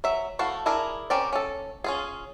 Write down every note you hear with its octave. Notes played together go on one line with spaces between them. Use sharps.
F#3 E5
A3 E4 F#4 A4 F5
D4 E4 G#4 A#4
C4 C#4 G4 A#4 D5
C#4 A4
C#4 F4 G#4